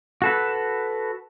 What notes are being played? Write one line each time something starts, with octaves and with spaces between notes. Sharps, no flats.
F#4 A4 B4